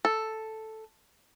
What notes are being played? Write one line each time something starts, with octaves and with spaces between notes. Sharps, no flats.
A4